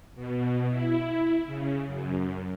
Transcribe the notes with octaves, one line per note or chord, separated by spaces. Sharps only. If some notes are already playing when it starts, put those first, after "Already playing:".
B2
E4
C#3
F#2